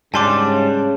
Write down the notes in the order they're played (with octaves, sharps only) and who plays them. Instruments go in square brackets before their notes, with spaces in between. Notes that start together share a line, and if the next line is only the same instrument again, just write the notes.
[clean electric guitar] G#2 G3 D4 [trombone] C#3 [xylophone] G#5 C6 D6 [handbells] A5